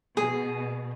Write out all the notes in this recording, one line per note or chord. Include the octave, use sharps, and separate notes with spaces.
B2 G#4